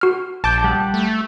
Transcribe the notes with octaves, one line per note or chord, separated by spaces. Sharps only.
F#4 F6
A#1 A5 D6 G6
G3 G4 F#5
A3